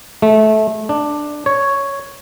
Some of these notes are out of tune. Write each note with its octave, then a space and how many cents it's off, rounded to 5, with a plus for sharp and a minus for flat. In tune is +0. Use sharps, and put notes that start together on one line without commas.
A3 -20
D4 +10
C#5 +0